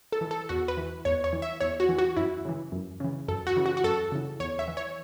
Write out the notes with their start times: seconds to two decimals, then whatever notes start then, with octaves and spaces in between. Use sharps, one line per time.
0.12 A4
0.21 E3
0.31 A4
0.49 E2 F#4
0.68 B4
0.77 E3
1.05 E2 C#5
1.24 C#5
1.33 E3
1.42 E5
1.61 E2 C#5
1.80 F#4
1.89 E3
1.99 F#4
2.17 F#2 E4
2.45 C#3 E3
2.72 F#2
3.00 C#3 E3
3.28 F#2 A4
3.47 F#4
3.56 C#3 E3
3.66 F#4
3.77 F#4
3.84 F#2 A4
4.12 C#3 E3
4.40 E2 C#5
4.59 E5
4.68 E3
4.77 C#5